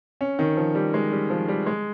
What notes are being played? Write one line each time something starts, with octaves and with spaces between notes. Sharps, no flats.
C#4
D#3
F3
G3
G#3
G3
F3
G3
G#3